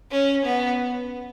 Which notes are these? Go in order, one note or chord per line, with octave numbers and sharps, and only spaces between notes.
C#4
B3